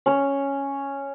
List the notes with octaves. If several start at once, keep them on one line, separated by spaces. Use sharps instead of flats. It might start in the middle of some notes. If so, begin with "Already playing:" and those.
C#4 C#5